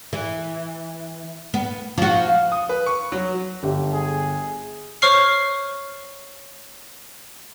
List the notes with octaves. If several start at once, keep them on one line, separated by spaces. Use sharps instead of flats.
E3
B3
F3 F#4
D#6
B4
C#6
F#3
G1 G4
G#4
C5 C#5 C#6 F6 C7